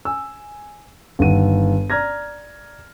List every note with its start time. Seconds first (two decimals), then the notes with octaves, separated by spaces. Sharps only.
0.05 G#5 E6
1.19 G1 D#3 F#5 D#7
1.90 D5 A#5 F6 G#6 A#6